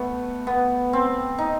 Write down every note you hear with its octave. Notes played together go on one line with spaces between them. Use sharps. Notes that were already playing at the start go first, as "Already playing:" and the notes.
Already playing: A3 B3
B3
C4
D#4